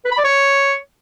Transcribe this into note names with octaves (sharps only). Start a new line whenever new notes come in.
B4
B5
D5
C#5